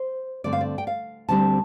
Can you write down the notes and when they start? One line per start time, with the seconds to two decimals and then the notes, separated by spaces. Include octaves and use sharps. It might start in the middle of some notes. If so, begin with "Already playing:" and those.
Already playing: C5
0.44 G2 D3 A3 C4 D5
0.53 F5
0.61 D5
0.78 G5
0.87 F5
1.29 D2 D3 G3 C4 A5